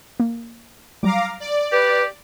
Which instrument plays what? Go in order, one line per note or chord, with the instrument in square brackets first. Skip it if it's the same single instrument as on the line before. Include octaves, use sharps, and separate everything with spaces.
[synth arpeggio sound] A#3
[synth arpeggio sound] F#3 G3 [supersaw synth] F5 A#5 D6
[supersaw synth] D5
[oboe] G4 [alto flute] B4